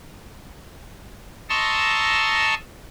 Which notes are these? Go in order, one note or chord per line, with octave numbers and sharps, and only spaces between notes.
D#5 A5 A#5 C6 C#6 E6